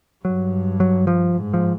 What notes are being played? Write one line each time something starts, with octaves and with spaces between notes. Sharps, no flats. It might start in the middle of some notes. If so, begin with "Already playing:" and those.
G2 F#3
F#3
F3
G#2
F3